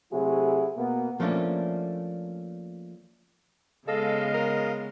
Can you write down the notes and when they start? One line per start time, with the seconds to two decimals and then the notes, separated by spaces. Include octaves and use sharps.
0.12 C3 F#3 A3 E4 F#4 G#4
0.77 B2 A#3 B3
1.20 F3 A3 A#3 C#4 D4
3.88 C#3 G#3 B3 A4 D#5 F5
4.34 A#4